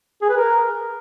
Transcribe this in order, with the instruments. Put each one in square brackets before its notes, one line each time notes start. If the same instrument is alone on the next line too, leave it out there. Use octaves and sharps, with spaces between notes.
[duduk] G#4
B4
A#4